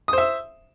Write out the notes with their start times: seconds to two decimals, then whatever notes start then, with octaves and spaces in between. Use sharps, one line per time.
0.08 D#6
0.13 C5
0.18 E5